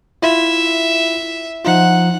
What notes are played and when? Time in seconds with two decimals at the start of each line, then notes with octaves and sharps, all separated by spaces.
0.22 E4 F4 E5
1.65 F3 D#4 F4 F#5